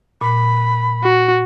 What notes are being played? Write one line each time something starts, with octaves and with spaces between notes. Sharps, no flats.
A#2 B5
F#4